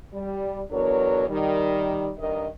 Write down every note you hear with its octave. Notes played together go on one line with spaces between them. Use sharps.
G3
E2 F#3 B3 D4 A#4 C#5
D#3 G3
G2 D#3 A#4 D#5